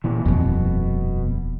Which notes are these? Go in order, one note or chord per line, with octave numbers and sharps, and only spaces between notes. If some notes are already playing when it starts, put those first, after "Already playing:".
A#2 E3
D#1 F2 B2